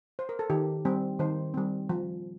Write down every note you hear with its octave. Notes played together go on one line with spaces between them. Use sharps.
C5
A#4
A4
D#3 G4
G3 C4
D#3 C5
G3 C4
F3